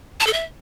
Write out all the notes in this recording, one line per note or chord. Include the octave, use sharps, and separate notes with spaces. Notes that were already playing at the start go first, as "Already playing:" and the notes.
A5
A4
E5